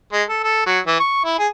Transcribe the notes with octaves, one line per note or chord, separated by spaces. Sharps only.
G#3
A4
A4
F#3
E3
C#6
E4
G#4